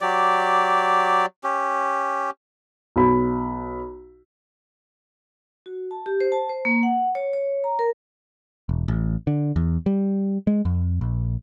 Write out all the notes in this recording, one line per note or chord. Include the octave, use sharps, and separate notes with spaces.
F#3 G4 D5
C#4 G4
B1 B5
F#4
A5
G4
C5
A5
C5
A#3
F#5
C#5
C#5
A#5
A#4
E1
A1
D3
E2
G3
G#3
F2
A#1